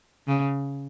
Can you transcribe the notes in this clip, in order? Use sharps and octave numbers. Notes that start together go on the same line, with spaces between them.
C#3